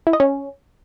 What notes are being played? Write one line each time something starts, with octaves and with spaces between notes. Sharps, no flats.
E4
D#5
C#4